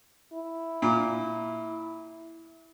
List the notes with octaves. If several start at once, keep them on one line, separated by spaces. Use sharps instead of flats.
E4
A#2